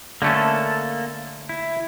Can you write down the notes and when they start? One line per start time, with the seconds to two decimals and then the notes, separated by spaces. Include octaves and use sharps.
0.22 D3 A3 A#3 C#4 A4
1.49 E4